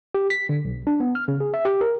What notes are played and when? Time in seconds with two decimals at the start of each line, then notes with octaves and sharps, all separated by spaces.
0.15 G4
0.30 B6
0.49 D3
0.65 B1
0.87 D4
1.00 B3
1.15 F6
1.28 C#3
1.40 G#4
1.54 E5
1.65 G4
1.81 A#4